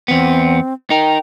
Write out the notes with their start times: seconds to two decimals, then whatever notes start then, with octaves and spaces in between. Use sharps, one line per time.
0.08 E2 B3 C4
0.90 D#4 A#4 G5